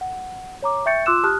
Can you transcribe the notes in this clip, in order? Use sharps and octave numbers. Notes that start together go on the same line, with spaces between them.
F#5
C#5 A#5 D6
E5 G5 C#6 G6 A6 C#7
F4 C6 D6 E6 F#6 E7
G4 A5 D#6 F6 F#6